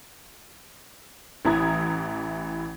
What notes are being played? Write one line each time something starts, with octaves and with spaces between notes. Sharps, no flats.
A1 E3 E4 A#5 D#6 G#6